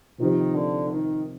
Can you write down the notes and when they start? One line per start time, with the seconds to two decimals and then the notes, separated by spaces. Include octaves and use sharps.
0.18 C3 D#3 F3 C4 D#4 G4
0.54 D3
0.89 D#3